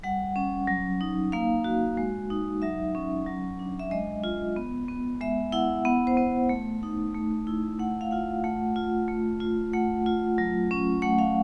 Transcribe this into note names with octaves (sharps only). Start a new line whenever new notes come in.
G3 F#5
C#4
F#3
D#4
A#3 F5
F#4
G#3
D#4
F#3 E5
C#4
F#3
D4
E5
G#3 D#5
F4
B3
B3
G#3 E5
E4 F#5
B3 F#5
C5
B3
A3
D#4
A3
E4
A3 F#5
F5
F4 F#5
A3 F#5
F4
A3
F4
A3 F#5
F4
F#3
C#4
A3 F#5
F5